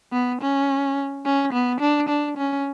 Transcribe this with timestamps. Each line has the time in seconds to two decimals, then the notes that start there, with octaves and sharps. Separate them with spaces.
0.13 B3
0.41 C#4
1.26 C#4
1.53 B3
1.81 D4
2.09 D4
2.37 C#4